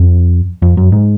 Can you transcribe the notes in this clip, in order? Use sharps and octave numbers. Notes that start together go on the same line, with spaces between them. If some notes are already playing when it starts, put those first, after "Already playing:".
Already playing: F2
F2
F#2
G#2